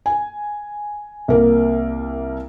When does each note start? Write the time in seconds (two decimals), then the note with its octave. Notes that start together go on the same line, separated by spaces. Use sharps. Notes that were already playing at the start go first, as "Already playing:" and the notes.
0.06 G#5
1.28 C2 A#3